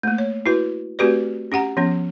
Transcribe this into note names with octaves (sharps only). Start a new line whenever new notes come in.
A3 A#3
C#5
E4 F#4 B4
A3 C4 F#4 G4 B4 D5
C#4 G4 F#5 A#5
F3 B3 C#4